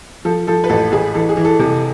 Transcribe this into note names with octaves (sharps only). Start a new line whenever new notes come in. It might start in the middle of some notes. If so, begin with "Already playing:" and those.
F3 A4
F3 A4
B4
A1 A4
A1 G#4
E3 A4
G#4
E3
A4
C3 A4